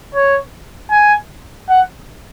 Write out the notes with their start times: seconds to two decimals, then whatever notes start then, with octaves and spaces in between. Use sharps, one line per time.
0.15 C#5
0.91 G#5
1.69 F#5